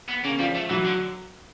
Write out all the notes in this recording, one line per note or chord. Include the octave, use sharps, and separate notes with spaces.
B3
C#3 A#3 C#4
F3 G3 F4
A3
E3 F#3 F#4
D3